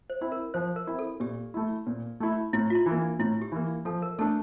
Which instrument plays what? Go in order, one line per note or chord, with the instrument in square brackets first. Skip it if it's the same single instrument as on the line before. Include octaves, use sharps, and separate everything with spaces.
[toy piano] C5
[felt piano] C4 E4
[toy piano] A#4
[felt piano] F3 [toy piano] C5
[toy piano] A#4
[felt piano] C4 E4
[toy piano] A4
[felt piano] A#2 [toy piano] G4
[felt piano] A3 E4
A#2
A3 E4
[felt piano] A2 [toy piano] E4
[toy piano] F4
E4
[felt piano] E3 A#3
[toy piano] D4
[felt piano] A2 [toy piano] E4
[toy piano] G4
[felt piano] E3 A#3
[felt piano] F3 [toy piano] A4
[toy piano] A#4
[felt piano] A3 D4 [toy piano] A4